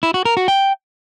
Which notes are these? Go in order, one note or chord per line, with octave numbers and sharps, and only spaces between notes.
E4
F#4
A#4
F#4
G5